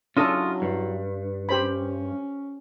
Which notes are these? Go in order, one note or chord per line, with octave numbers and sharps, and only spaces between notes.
F#3 C#4 D4 E4 F4 A4 D#5
G2
C#4 G4 C5 B5